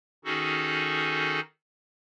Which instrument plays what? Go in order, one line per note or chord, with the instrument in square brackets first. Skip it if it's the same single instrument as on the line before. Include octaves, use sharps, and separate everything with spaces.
[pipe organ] D#3 C#4 D#4 F#4 G#4 A4